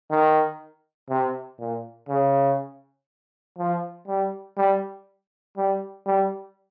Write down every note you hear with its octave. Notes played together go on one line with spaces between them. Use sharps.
D#3
C3
A#2
C#3
F3
G3
G3
G3
G3